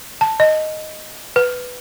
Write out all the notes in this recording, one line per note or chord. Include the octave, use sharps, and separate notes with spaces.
A5
D#5
B4